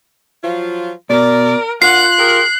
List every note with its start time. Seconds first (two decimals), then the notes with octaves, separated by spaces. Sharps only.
0.43 F3 F#3 F4
1.10 B2 A#4 D5
1.82 D4 F4 A#4 F#5 F#6 C7
2.19 G4 G#4 A#4